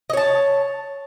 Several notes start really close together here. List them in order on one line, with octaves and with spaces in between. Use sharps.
D#5 C#5 A5